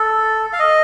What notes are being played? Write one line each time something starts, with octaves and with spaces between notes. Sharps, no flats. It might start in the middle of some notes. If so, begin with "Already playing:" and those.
Already playing: A4
F5
D#5